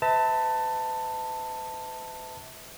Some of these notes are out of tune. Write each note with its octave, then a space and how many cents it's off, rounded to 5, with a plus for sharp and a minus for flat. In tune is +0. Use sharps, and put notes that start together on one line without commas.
B4 +40 E5 -30 A5 +15